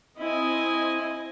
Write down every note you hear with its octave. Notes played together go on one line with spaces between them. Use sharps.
C4 E4 D#5 G#5